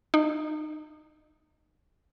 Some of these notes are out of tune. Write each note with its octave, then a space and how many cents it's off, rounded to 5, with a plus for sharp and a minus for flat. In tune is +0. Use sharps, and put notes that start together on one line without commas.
D#4 -25